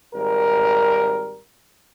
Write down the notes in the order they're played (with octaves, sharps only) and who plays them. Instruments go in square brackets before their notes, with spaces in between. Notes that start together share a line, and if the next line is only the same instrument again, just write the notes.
[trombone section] G#1 G3 A#4